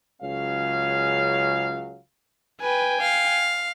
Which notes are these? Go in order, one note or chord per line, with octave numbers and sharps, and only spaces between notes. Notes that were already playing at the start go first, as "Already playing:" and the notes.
C#2 F#3 C#4 G#4 F5
B4 G5 G#5
F5